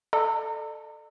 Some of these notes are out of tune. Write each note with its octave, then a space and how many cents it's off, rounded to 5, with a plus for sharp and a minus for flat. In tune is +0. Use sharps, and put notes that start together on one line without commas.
A4 +0 D5 +45 A#5 -35